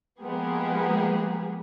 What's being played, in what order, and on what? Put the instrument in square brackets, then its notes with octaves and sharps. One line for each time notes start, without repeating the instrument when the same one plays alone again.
[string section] F3 G#3 A#3 B3 G4 G#4